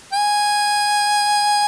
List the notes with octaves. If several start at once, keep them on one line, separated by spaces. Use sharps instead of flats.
G#5